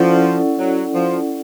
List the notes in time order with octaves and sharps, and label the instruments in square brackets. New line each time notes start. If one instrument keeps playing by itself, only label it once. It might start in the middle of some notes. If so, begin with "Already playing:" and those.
Already playing: [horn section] F3 [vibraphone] C#4 E4 A4 D5 F#5
[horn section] F#3
F3